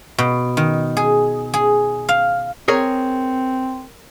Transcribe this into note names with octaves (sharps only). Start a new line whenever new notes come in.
B2
D#3
G#4
G#4
F5
C4 G#4 A#4 C#5